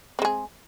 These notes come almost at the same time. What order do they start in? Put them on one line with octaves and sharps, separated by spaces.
C4 G#3 G#4